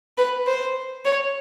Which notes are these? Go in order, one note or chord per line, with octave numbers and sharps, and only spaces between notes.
B4
C5
C#5